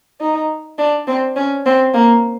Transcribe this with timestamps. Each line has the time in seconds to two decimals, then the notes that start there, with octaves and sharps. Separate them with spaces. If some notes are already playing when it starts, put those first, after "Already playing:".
0.21 D#4
0.78 D4
1.07 C4
1.36 C#4
1.66 C4
1.94 A#3